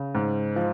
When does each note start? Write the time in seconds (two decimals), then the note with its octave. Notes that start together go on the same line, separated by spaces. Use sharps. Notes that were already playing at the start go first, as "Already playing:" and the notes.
Already playing: C#3
0.15 G#2
0.56 F3